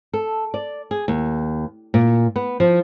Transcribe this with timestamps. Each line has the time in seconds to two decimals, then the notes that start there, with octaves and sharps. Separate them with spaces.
0.13 A4
0.54 D5
0.91 G#4
1.08 D#2
1.94 A#2
2.36 B3
2.60 F3